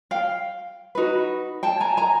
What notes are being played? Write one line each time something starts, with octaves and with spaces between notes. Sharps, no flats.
F5 G5
D#4 F#4 B4
G5 A5
G#5 A#5
G#5 A#5